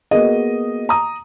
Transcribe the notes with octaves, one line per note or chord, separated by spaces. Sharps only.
A#3 B3 F#4 G#4 D#5
A#5 D#6